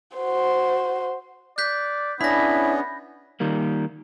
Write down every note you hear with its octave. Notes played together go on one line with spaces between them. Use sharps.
F#4 C5
D5 F#6 G6 B6
B3 C#4 D4 E4 G#4 B5 A#6
D#3 G3 A#3